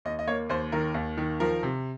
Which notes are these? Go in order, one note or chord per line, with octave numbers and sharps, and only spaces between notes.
D#2 D#5
D#5
A#3 C#5
D#2 C5
D#3 A#4
D#2
D#3
F3 A#4
C3